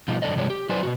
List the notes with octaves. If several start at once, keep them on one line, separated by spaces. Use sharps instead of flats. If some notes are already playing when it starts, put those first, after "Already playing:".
B2 F3 G3 D#4 F4
F#2 D3 B3 A4 D5 D#5
G2 C3 F3 G#3 D4 C#5
G4
F#3 E4 B4 C5 D5 G#5
B2 E3 F#4